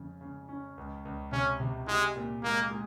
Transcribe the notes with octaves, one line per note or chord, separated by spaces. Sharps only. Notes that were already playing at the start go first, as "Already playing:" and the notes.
Already playing: F2 C#3
C#3
C#4
C#2
C#2
C3 C#4
C3
G#3 G4
A#2
G#3 A#3
G#3